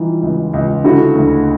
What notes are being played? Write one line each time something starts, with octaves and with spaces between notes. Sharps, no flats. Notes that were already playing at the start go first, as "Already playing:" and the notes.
Already playing: E3 G3 D#4 F4
C#2
C#2
D3 E4 F#4
D2